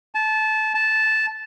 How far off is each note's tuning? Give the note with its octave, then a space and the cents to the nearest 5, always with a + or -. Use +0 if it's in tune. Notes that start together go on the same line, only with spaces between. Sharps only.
A5 -20
A5 -10